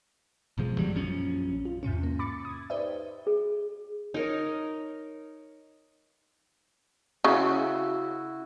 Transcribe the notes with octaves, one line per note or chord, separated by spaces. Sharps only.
G#1 B2 F3 G#3
G2 D#3 F#3 G3
A#1 F#2 F3 C#4
F4
E2 G#2 C3 C#4
A#3
B5 D6 A6 C#7
D#6 G#6
D#4 G4 B4 C5 D5 E5
G#4
D#4 A#4 C#5
C#3 E4 F#4